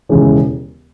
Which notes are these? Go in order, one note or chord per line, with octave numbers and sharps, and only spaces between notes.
E1 D#2 C#3 E3 G#3